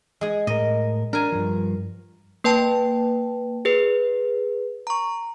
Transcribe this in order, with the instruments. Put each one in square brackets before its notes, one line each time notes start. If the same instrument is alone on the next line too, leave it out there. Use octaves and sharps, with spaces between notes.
[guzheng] G#3 G#4
[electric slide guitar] A2 A#4 [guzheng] D#5
[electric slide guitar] D4 [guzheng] A#4 G#5
[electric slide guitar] G2 F3
[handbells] A#3 B4 G5 A5
G#4 B4
A#5 C#6